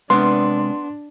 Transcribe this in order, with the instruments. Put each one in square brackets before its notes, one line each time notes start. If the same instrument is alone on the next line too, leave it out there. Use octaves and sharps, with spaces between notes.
[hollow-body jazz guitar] C3 G#3 D5 [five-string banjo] B3 [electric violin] D4 [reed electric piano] C6